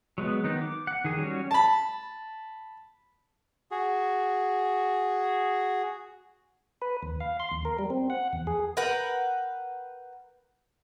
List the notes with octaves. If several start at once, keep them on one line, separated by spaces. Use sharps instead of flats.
F#3 G#3 B3
D#3 B3 D#4
D6
F#5
D#3 G#4
G3 C#4 F#4
A5 B5
F#4 G#4
B4
D#2
F5
C6
D#2
A#4
G3
C4
F#5
E2
G#4
A#4 B4 F#5 G5